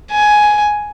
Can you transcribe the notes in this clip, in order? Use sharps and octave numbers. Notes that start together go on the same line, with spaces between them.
G#5